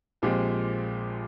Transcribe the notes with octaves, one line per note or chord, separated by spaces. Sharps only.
A#1 A#2 G#3 C4 G4